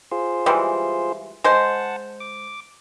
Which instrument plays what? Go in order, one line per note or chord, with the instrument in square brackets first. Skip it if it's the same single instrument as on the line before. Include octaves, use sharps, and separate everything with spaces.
[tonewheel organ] F4 G#4 C5
[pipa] E3 G3 G#3
[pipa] G#3 C5 [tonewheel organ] F#5 A5
[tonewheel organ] D6